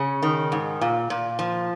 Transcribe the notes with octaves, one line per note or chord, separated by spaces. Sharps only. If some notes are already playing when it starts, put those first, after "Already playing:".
Already playing: C#3 C#4
D#3
G#2
A#2
A#2
F3